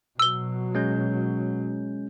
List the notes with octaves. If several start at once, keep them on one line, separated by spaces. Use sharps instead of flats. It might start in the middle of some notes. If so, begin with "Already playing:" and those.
B2 F#3 E6 G7
G#3 C#4 G6